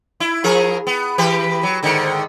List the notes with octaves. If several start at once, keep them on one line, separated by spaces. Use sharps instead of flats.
E4
F3 G#4 A#4
B3
E3 G4 B4
F#3
G#2 D3 D#3